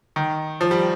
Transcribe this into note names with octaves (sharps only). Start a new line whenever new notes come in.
D#3
F3
G3